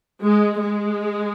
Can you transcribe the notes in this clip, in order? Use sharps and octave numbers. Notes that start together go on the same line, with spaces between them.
G#3
G#3